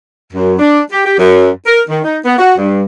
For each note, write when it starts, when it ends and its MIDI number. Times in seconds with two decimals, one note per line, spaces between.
0.33 0.54 42
0.59 0.81 62
0.91 1.03 67
1.05 1.15 67
1.18 1.49 42
1.66 1.81 70
1.89 2.00 51
2.04 2.18 63
2.25 2.35 59
2.39 2.52 66
2.58 2.84 43